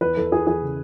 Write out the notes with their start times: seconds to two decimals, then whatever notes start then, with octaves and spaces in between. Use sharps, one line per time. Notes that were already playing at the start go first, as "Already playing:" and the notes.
0.01 E2 B4
0.17 E2 A4
0.31 E3 G#4
0.47 E2 G#4
0.62 C#3